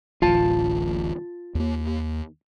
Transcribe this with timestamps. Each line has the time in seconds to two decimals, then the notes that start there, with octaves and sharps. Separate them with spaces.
0.22 D1 A1 F4 A5
1.55 D#2 A#3